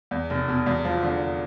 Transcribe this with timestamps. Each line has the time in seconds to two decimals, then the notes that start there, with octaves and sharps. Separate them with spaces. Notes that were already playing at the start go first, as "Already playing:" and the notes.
0.11 E2
0.30 F1
0.48 B2
0.66 E2
0.85 F3
1.03 D3